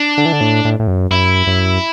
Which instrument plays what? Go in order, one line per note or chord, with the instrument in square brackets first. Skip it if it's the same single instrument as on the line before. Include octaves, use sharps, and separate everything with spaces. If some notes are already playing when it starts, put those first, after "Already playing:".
Already playing: [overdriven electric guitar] D4
[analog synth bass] D3
E3
D3
A2
A2
A2
F#2
[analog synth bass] F#2 [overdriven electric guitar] E4
[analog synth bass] F#2